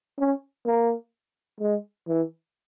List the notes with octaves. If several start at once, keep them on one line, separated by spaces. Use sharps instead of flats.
C#4
A#3
G#3
E3